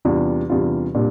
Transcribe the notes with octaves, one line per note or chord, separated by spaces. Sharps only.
E2 C3 G3 D4 F4
E2 C3 G3 D4 F4
A#2 G3 D4